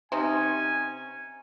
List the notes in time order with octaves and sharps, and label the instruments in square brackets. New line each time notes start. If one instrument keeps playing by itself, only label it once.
[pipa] C3 C#4 D#4 [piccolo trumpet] G#5